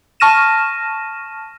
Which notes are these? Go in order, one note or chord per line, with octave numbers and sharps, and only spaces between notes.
A5 C#6 F6 A#6 D#7 E7